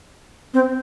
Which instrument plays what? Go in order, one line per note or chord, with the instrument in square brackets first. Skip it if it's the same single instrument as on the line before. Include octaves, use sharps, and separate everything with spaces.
[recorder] C4